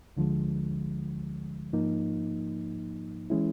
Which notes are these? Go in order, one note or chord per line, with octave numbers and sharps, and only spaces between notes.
D2 D3 F3 G#3
G#2 F3 A#3 D#4
E3 G#3 C#4 E4